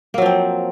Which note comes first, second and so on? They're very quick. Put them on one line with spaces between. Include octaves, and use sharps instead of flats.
A#3 F#3 F3 C4